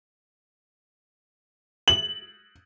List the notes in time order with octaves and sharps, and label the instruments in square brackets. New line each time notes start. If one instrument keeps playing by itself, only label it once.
[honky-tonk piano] F#7